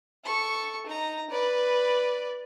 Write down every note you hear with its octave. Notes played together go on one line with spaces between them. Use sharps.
A4 C#6
D#4 A#5
B4 D5